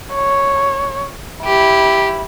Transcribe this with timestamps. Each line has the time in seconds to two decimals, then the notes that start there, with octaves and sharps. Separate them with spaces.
0.13 C#5
1.45 E4 G4